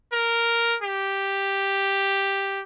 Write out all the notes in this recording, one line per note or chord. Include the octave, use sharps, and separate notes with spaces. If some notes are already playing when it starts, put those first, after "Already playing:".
A#4
G4